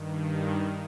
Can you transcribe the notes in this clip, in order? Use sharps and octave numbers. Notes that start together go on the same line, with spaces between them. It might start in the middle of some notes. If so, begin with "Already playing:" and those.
Already playing: G2 D#3